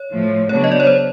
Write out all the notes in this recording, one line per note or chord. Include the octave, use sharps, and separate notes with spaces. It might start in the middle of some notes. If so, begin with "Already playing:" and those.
Already playing: C#5
A2 F3 A3
C#3 F#3 B3 D4 C#5
D#5
D5
C#5
C5